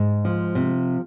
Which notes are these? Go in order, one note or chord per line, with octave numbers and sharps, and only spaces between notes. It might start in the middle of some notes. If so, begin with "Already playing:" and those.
Already playing: G#2
F3
C3